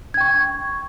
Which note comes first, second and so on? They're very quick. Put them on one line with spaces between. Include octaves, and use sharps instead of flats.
G#6 G5 C#6